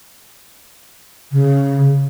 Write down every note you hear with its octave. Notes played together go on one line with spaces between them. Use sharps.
C#3